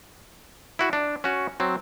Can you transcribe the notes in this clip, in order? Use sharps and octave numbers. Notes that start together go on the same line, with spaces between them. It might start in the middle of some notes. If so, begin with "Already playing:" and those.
E4 F#4
D4
C#4 F#4
F#3 C4